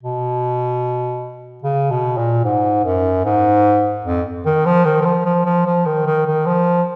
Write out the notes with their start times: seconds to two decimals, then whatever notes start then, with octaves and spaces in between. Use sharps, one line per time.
0.03 B2
1.64 C#3
1.91 B2
2.17 A#2
2.44 G#2
2.84 F#2
3.25 G#2
4.05 F2
4.46 D#3
4.66 F3
4.85 D#3
5.01 D#3
5.05 F3
5.25 F3
5.46 F3
5.66 F3
5.86 D#3
6.06 D#3
6.26 D#3
6.46 F3